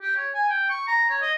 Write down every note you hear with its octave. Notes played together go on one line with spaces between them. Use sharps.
G4
C#5
G#5
G5
C#6
A#5
C#5
D#5